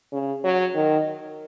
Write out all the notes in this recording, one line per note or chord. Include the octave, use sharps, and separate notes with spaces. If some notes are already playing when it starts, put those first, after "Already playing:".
C#3
F#3
D#3